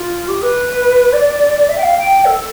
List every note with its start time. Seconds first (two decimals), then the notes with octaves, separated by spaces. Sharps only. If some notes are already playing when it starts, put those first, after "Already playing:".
Already playing: F4
0.28 G4
0.42 B4
1.13 D5
1.69 E5
1.78 G5
1.83 F5
1.97 G5
2.25 A4